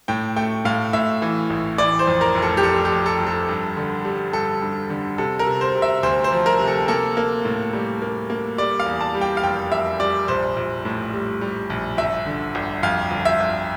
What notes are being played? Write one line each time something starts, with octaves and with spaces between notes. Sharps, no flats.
A2 G5
A3 G5
A2 F5
A2 E5
E3
A1
E3 D5
C5
F2
A#4
F1
A4
G4
F1 A4
G4
F2
A4
F2
A4
G2
D3
G3
G2 A4
G2
D3
C3 A4
A#4
C3
C5
C3
E5
D2 C5
C5
F3
A#4
C3
A4
A#3 A4
A#3
A2
G3
A#3
A#3
G3 D5
F5
E2
A5
G3
G5
F5
F1 G5
F1 E5
G3 D5
A#1 C5
A#1
A2
G3
G3
A#1
G1 E5
D3
G1
F2 F5
G1
E5
G1